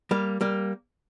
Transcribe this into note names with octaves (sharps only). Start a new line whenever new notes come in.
G3 A#3
G3 A#3